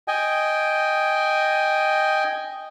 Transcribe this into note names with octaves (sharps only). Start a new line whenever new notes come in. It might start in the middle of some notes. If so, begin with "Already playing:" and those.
D#5 G5 G#5